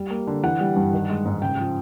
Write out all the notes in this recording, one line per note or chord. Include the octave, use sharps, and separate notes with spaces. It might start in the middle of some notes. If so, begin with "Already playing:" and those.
Already playing: G3
A#3
D3
E3 F#5
G3
G2
D#3
G#3
G#2
C#3 G5
F3